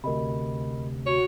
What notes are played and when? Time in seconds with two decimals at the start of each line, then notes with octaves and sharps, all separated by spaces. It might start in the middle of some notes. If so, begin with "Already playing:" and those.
0.04 D2 C3 A#4 D#5 B5
1.06 F#4 C#5